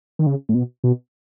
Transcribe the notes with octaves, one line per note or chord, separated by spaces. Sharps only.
D#3
C#3
A2
B2
B2